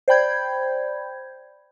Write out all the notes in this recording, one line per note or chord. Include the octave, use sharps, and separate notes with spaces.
C5 D5 G5 B5 G6 G#6